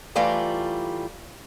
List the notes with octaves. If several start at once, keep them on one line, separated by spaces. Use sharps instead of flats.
E3 G3 A3 F4 D5 A#5